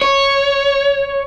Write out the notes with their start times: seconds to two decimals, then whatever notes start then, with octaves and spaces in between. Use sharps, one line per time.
0.02 C#5